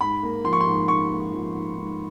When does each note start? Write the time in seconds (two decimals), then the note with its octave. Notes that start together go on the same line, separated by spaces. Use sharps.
0.01 G#2 B5
0.23 A#3
0.44 F3 C6
0.53 C#6
0.60 C6
0.67 G#2
0.88 G#2 C#6
1.10 A#3
1.32 F3
1.54 G#2
1.77 G#2